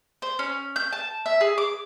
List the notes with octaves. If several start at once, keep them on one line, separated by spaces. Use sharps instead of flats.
C5
C#4
G6
A5
E5
G#4
D6